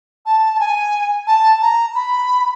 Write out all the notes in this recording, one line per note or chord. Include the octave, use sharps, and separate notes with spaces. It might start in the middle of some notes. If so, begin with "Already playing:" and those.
A5
A5
G#5
A5
A#5
B5